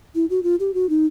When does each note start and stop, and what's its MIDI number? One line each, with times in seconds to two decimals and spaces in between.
0.15 0.26 64
0.30 0.43 66
0.43 0.56 65
0.60 0.71 67
0.74 0.89 66
0.89 1.06 63